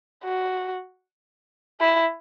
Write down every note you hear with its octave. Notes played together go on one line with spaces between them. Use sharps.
F#4
E4